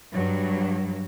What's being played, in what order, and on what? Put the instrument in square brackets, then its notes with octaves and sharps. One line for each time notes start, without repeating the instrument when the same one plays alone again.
[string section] G2 F#3